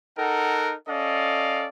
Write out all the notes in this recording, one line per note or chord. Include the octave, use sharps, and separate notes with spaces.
D#4 A4 A#4 F#5
C#4 A4 D5 D#5 F5